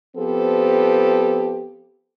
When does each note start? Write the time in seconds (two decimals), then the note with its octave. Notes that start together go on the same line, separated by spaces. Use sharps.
0.17 F3 B3 C4 G4 A4